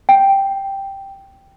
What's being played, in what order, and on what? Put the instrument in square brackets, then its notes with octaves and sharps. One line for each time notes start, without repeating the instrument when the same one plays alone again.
[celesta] G5